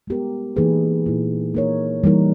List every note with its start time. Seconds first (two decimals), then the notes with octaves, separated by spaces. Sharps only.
0.07 G#3 B3 G4 A#4
0.56 E3 A#3 D#4 G#4 B4
1.06 A#2 A#3 E4
1.54 A#3 D#4 A#4 C#5
2.04 E3 G3 A#3 D#4 A#4